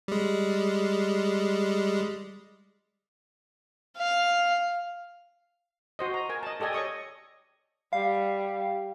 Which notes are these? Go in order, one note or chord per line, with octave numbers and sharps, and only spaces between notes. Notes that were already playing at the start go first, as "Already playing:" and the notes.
G3 G#3
F5
F#4 C5 D#5
A#5
A#4 G#5
D#5 A5
G4 A4 D5 D#5 G#5
C#5 D#5 C#6 D#6
G3 F5